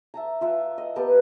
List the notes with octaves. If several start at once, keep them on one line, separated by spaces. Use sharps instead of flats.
E5 A5 A#5
F4 E5 F#5
D#5
B3 G4 A#4 A5